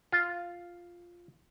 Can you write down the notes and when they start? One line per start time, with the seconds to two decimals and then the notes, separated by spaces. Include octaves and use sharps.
0.12 F4